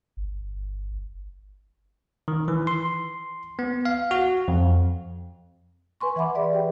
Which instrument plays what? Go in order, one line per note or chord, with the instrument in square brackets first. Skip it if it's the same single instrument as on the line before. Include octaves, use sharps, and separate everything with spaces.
[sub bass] G1
[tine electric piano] D#3
E3
C6
B3
F5
F#4
F2
[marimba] B4 G#5 C6 C#6
E3 E5 F#5 B5 D6
G#4 B4 D5 E5
G4 G5